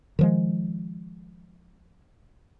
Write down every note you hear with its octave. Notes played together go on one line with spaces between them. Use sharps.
D#3 F3 G#3